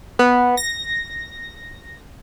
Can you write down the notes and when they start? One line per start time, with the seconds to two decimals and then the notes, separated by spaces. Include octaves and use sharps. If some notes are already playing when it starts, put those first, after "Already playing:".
0.19 B3
0.57 A#6